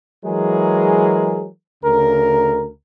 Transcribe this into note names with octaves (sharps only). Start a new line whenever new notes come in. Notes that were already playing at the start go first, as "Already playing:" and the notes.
E3 F#3 G#3 G#4 A#4
D2 C#3 A#4